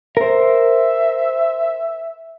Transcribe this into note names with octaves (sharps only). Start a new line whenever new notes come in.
A#4 C5 E5